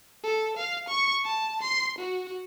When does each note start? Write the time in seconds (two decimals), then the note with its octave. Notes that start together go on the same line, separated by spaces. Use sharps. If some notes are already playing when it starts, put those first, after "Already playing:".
0.23 A4
0.57 F5
0.89 C#6
1.24 A5
1.62 C6
1.98 F#4